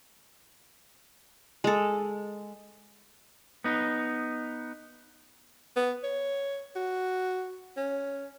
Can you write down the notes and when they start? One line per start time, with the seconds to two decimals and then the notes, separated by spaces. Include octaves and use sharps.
1.64 G#3 A4
3.64 B3 D#4
5.76 B3
6.03 C#5
6.76 F#4
7.77 C#4